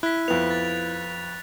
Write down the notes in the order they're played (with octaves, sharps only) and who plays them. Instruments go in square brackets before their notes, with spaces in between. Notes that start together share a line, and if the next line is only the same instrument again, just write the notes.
[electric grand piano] E4 [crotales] F#6 B6
[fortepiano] F2 B3 [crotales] F7
[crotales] A6